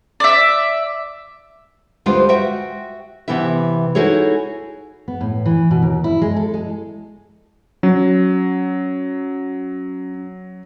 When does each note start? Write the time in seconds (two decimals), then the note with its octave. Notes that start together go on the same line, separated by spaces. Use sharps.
0.20 D5 E5
2.06 D2 G3 G#3 F4 B4 C5
2.29 F#4 E5 G5
3.28 C3 E3 B3 E4 E5
3.95 D#4 E4 F#4 G#4 A4 C#5
5.08 B3
5.21 A2
5.46 E3
5.71 B2
5.82 D#2
6.04 E4
6.22 G#3
6.36 A4
6.54 G#3
7.83 F#3 C#4